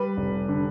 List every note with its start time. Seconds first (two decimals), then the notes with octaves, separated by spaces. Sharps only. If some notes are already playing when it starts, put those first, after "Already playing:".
Already playing: G3 B4
0.17 F1
0.49 D3